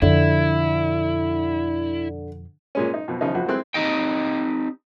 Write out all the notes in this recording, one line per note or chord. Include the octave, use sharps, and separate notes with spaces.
F2 B2 D3 E4
A#2 G#3 C#4
D#4
F2 B2
E2 C#3 F3 D#4
A#1 F2 F#4
G#3 C4 E4 C6 F#6
C4 D#4 G4 D#5 G5